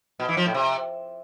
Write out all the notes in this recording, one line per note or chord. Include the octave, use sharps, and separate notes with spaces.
B2
E3
F3
A2
C3